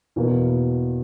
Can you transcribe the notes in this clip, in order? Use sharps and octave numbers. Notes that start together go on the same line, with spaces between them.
E2 B2 A#3